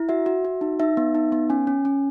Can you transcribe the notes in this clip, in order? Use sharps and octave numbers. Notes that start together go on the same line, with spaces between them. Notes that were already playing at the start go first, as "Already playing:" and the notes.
Already playing: E4
F#4 E5
F#4
F#4
D#4
D#4 E5
B3
D#4
B3
C#4 G#5
C#4
C#4